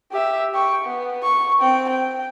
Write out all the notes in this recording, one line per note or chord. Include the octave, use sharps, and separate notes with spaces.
G4 E5
G5 C#6
B3
C#6
C4 G5
G5